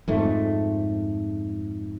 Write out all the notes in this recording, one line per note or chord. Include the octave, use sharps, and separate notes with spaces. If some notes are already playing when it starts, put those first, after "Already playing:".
F2 G#2 A3